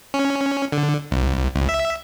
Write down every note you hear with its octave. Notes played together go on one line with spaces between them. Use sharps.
C#4
D3
C2
C#2
E5